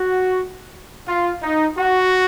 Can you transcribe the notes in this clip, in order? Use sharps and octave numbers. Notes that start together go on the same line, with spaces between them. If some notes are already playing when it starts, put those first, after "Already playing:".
Already playing: F#4
F4
D#4
F#4